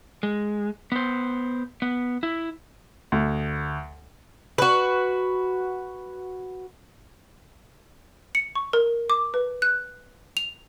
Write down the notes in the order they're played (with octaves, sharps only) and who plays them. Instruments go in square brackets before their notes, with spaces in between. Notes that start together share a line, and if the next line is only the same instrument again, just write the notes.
[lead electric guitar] G#3
B3 C5
B3
E4
[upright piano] D2
[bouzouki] F#4 B4
[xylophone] C#7
C#6
A#4
D6
B4
F#6
F7